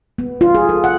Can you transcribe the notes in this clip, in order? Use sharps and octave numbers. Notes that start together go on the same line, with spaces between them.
B3
F4
G#4
A4
F#5